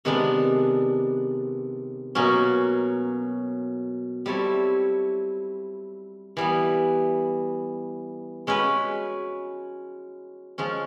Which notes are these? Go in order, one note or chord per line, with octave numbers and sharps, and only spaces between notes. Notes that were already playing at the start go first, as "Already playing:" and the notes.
C3 D#3 G#3 B3 D4
B2 F#3 A#3 C#4
G3 C4 E4 A4 C#5
E3 G3 B3
G#3 C#4 F#4 B4
F3 G#3 C#4